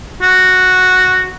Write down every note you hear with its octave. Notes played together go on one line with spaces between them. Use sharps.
F#4